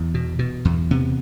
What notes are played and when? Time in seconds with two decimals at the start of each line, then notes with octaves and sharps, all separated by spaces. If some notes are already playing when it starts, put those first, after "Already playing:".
Already playing: E2 E3
0.14 B2
0.39 B2
0.65 E2
0.91 C3 B3